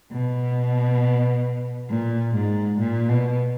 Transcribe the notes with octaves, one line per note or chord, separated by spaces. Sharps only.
B2
A#2
G#2
A#2
B2